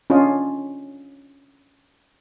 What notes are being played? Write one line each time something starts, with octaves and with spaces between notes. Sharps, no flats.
C#4 D4 F4 D#5